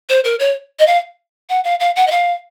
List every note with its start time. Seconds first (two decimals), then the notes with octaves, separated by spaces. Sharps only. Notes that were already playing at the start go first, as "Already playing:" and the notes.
0.09 C5
0.24 A#4
0.39 C#5
0.79 D#5
0.87 F5
1.49 F#5
1.64 F5
1.80 F5
1.96 F#5
2.07 D#5
2.11 F5